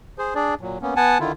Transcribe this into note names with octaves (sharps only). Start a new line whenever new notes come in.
G#4 C5
D4 G#4 D5
A#2 F#3
A#3 B3 C#4
B3 F#5 G#5 A5
D3 D#3 E4 F4